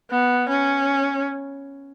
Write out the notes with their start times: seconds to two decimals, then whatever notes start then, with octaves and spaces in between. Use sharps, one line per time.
0.11 B3
0.49 C#4